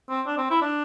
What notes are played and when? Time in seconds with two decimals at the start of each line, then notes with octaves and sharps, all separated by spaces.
0.09 C4
0.27 D4
0.38 C4
0.51 E4
0.62 D4